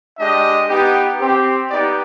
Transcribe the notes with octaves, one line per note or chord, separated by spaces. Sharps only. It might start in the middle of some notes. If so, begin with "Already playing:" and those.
G#3 D4 G4 D#5
B3 D#4 G4
C4 G4
B3 D#4 G4 D5